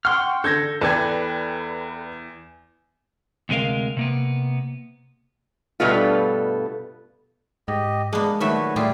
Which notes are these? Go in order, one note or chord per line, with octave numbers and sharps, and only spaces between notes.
F#5 G5 C6 C#6 F6
D3 A4 G6 G#6 A#6
E2 A4 B4 D5 G5 G#5 G#6
D2 C3 G#3 A#4 F5
C3 A#3 B3
G2 B2 G3 A3 B3 F4
G#2 G4 D#5
G#3 A#3 B3 D4
A#2 D#3 F#3 A3 F#4 B4 C#5 E5
A2 G3 E4 F4 G4 G#4